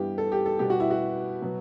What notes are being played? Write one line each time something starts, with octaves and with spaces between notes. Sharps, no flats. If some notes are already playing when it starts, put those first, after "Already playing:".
Already playing: G2 E3 G3 B3 G4
A4
G4
A4
B2 G3 B3 G4
F#4
E4
F#4
B2 F#3 B3